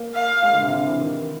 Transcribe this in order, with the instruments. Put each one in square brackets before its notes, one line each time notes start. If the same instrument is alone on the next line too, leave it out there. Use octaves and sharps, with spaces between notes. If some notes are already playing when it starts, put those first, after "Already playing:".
Already playing: [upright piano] A#3
[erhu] F5
[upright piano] G#3
D3
C3
D3
E3
D#3